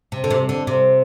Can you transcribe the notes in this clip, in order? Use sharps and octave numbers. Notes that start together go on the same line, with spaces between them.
C3
D3
C3
D3
C3